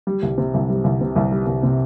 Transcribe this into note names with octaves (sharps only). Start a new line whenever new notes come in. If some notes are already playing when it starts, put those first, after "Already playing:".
G3
C2
C3
C2
G3
C2
C3
C2
G3
C2
C3